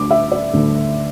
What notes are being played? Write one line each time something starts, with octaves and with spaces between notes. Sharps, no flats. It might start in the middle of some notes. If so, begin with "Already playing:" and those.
Already playing: D2 D3 A3 D4 D6
E5
D5
D2 D3 A3 D4